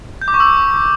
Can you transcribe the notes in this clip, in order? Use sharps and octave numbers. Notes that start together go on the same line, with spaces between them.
G6
D6
C#6
E6